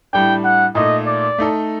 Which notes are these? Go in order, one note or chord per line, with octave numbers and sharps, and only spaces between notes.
A2 G3 D4 G5
F#5
A#2 A3 D#4 D#5
D5
A3 D#4 A4